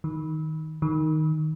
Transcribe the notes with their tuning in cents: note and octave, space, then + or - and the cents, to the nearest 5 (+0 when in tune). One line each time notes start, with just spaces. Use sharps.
D#3 +10
D#3 +0